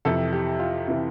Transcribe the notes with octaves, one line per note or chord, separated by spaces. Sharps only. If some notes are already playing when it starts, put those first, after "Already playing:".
F2 C3 E3 A4
G4
F4
C3 E3